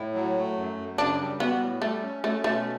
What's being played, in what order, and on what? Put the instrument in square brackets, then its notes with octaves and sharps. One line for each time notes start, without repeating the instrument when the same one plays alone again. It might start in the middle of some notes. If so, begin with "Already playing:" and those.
Already playing: [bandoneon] A2 [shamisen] E4
[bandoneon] F#3
A3
F#2
F#2
[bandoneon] C#3 [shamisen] D4
[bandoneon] G3
[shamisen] B3 [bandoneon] F#4
[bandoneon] A2
[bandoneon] G3 [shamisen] A3
[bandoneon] C#4
[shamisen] A3 [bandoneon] C#4
[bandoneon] B2 [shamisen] A3